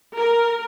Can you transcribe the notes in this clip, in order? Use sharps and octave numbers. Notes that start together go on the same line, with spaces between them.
A#4